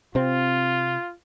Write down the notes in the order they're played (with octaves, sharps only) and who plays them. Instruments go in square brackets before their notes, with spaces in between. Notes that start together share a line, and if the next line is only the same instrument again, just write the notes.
[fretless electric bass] C3 C4 [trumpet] F4